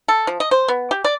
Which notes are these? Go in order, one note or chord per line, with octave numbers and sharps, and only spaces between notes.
A4
F3
D#5
C5
B3
G4
D5